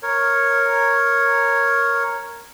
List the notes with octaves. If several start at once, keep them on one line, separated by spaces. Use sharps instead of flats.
A#4 C#5